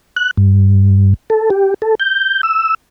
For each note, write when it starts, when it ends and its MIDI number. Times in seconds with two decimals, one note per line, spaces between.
0.16 0.31 90
0.37 1.14 43
1.30 1.50 69
1.50 1.74 67
1.82 1.95 69
2.00 2.41 91
2.43 2.75 88